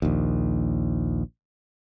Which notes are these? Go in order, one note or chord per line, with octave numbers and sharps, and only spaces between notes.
A#1 D#2